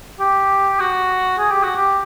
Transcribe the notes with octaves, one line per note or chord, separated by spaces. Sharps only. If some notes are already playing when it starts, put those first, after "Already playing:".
G4
F#4
G#4
G4
F#4
G4